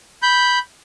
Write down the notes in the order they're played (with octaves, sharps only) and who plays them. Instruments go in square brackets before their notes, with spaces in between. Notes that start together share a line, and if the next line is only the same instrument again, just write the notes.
[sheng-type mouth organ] B5 G6